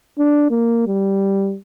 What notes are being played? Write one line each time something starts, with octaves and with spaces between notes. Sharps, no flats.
D4
A#3
G3